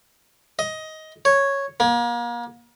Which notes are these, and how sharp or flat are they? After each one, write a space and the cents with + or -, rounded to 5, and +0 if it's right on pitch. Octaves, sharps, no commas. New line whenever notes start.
D#5 +15
C#5 -5
A#3 +35